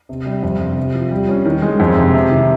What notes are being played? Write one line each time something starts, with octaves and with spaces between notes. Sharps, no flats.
C3
G3
F2
C3
C3
F3
G3
C#4
D#3
G#3
F2
C3
C3
D#3